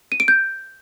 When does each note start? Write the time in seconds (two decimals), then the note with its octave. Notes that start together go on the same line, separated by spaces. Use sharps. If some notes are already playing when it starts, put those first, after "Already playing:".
0.12 D#7
0.20 D7
0.28 G6